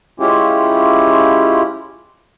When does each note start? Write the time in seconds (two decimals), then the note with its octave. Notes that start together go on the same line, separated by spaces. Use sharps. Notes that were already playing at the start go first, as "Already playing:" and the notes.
0.20 G#3 C#4 E4 F4 G4